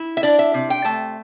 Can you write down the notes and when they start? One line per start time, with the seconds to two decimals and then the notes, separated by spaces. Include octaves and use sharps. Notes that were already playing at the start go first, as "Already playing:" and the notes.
Already playing: E4
0.17 E5
0.23 D4 D5
0.39 E5
0.54 C3
0.70 G5
0.84 A3 A5